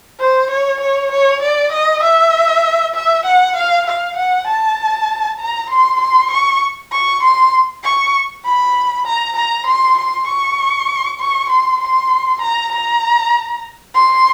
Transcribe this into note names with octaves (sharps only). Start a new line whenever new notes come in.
C5
C#5
C#5
C#5
D5
D#5
E5
E5
F#5
F5
F5
F#5
A5
A#5
C6
C6
C#6
C#6
C6
C#6
B5
A#5
A#5
C6
C6
C#6
C#6
C6
C6
A#5
A#5
C6